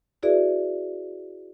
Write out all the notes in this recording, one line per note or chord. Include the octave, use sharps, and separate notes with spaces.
E4 F#4 G#4 B4 D5 E5